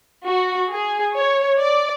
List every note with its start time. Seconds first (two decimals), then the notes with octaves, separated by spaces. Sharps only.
0.26 F#4
0.71 G#4
1.15 C#5
1.60 D5